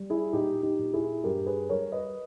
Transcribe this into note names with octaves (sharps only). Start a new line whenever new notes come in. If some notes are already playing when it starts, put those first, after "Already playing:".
Already playing: G3
E4 G#4
A#2 D#4 G4
D#4 G4
A#2
E4 G#4
G2 G4 A#4
G#4 B4
G3 A#4 C#5
B4 D#5